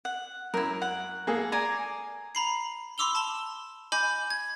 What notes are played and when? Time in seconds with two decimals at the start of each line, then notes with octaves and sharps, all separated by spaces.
0.05 F#5
0.54 F#2 E4 A#4
0.82 F#5
1.27 A#3 G#4 A4
1.52 D5 G#5 A#5
2.35 A#5 B5 C7
2.98 B5 C6 D6 E6 F7 G7
3.15 A5 E7 G7
3.92 D#5 G#5 B5 D6 G6
4.30 G#6